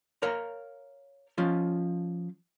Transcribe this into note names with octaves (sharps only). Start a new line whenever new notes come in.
A#4 C#5 F5 A#5
F3 C#4 F4